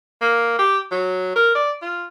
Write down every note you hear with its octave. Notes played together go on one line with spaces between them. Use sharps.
A#3
G4
F#3
A#4
D5
F4